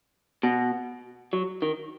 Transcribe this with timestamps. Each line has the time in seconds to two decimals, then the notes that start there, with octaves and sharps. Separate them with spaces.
0.43 B2
1.33 F#3
1.62 D#3